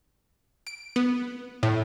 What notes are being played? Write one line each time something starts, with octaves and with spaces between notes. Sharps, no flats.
D7
B3
A2